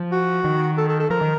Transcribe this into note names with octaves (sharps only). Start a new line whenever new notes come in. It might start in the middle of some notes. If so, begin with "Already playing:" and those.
Already playing: F3
F#4
D#3
A4
A4
A4
F3 A#4
D#3